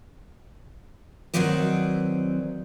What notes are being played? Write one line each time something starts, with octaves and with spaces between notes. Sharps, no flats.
D#3 E3 F#3 C4 D5 D#5